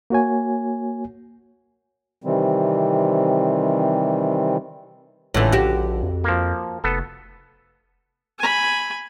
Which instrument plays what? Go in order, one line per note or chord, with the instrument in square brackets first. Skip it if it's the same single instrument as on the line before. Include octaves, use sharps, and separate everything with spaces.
[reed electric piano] A#3 F#4 C#5 G#5
[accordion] C3 D#3 E3 G3 C4
[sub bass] G#1 [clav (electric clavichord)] C#2 D3 [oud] A2 E3
[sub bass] A#1 [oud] F#4 G4
[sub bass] F2
[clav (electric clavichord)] F3 A#3
[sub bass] F1 [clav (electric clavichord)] B3 A4
[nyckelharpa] G#5 B5